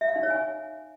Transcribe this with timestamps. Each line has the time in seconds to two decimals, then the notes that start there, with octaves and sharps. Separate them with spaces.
0.01 E5
0.08 F5
0.16 D#4
0.23 C#5
0.30 G#5